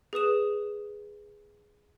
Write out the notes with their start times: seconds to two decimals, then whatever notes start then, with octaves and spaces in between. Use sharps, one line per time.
0.13 G#4 B4 D#6 E7